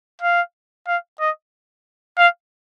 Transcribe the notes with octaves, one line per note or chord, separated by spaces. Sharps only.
F5
F5
D#5
F5